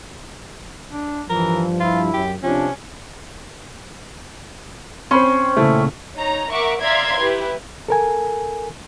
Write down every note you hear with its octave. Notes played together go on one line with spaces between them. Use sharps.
D4
G2 E3 F3 A#4
E4 F4
F#2 G4
C3 F3 C#4 D4
C4 C#4 C5 B5 C6
A#2 C#3 A3 E4
D#4 C#5 A#5
A#4 E5 F#5 C#6 D6
D5 E5 F5 A#5 C6 G#6
E4 G4 B4
A4 A#4 G#5